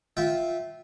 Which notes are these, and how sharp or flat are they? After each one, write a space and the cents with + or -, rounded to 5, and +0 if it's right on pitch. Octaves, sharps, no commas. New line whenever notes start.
F4 +0 E5 -10 G5 -20